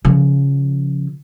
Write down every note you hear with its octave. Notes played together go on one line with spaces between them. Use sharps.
C#3 F3